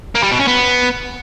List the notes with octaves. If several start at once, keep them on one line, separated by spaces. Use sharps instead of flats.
A#3
G3
B2
C#4
B3